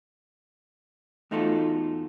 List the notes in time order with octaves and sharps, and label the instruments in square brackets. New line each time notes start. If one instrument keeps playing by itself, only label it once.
[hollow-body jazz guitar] E2 A3 D#4 F4 F#4 A4